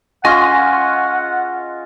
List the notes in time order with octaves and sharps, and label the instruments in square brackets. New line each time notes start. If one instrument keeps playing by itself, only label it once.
[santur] G#3 C#4 F4 [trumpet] F#5 [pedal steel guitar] G#5 C6 [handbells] A#6